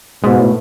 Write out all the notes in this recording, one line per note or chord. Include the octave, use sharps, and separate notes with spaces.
G#2 B2
A2